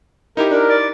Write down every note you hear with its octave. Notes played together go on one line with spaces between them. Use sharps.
D#4 E4 G4 A#4
D4 A#4
D5